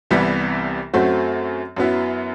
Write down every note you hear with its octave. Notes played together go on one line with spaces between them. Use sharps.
C2 C3 E3 G3 B3
F#2 F#3 A3 C4 F#4
F#2 F#3 B3 E4